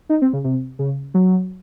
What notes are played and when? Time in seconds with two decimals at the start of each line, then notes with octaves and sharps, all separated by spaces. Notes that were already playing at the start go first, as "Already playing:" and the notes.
0.09 D#4
0.22 C4
0.33 C#3
0.44 C3
0.79 C#3
1.14 F#3